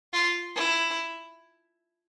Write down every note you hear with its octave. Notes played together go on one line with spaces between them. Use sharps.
F4
E4